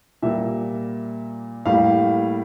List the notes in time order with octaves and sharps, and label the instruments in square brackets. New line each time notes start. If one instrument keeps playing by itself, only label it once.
[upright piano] A#2 G3 A#3 E5
A2 G3 A#3 F5